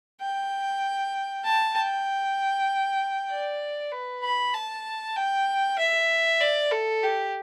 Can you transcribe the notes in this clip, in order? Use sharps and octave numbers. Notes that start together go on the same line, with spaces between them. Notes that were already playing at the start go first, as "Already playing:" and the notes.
G5
A5
G5
D5
B4
B5
A5
G5
E5
D5
A4
G4